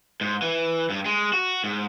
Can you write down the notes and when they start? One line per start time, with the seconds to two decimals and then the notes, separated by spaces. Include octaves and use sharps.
0.21 G#2
0.42 E3
0.90 G2
1.05 G#3
1.33 F#4
1.64 G#2